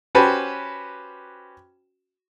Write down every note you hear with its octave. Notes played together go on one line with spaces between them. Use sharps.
C#4 F#4 G4 B4 C5 A5